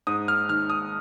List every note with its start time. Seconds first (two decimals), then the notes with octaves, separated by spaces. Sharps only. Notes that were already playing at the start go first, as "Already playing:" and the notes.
0.07 G#2 D#6
0.28 F6
0.49 D#3 F6
0.70 D#6